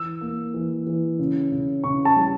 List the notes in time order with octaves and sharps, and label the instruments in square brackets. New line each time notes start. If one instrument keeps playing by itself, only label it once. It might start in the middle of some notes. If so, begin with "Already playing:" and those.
Already playing: [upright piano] E3 [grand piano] E6
[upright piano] A#3
E3
E3
C#3
C#3
[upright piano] C#3 [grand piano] C#6
[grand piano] A5
[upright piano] G3